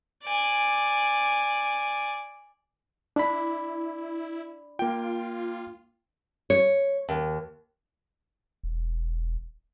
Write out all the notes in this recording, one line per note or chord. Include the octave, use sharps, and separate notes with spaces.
D5 G#5
D4 E4 D5 B5
A#3 F4 G5
C#5
D#2
E1